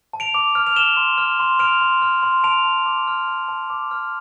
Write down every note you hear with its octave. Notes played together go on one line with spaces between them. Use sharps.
A5
D7 F7
D6
F6
F7
F6 E7 G7
C6
F6
C6
F6 D7 F7
C6
F6
C6
A5 D7 F7
A5
D6
F6
A5
A5
D6
F6